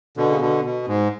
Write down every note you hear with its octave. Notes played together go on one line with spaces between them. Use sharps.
B2 D3
C#3
B2 D3
B2
G#2